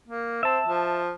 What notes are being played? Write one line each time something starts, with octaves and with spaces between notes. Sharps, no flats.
A#3
C4 E5 A5
F3